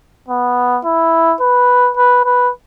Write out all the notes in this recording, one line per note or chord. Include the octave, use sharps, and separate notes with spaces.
B3
E4
B4
B4
B4